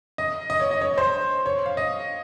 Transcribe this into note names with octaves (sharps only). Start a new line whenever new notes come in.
D#5
D#5
C#5
D#5
C#5
C5
C#5
F5
D#5